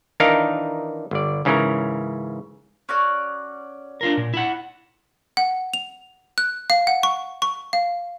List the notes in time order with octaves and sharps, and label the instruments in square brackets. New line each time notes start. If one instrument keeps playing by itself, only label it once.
[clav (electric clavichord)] D#3 E3 D4 D#4 A#4 F5
G1 D5
G#2 C#3 E3 C#4 A#4
[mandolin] C#4 F#4 D5
[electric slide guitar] D4 F4 A#4
A#2
E4 F#5
[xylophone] F#5
F7
F#6
F5
F#5
C#6
C#6
F5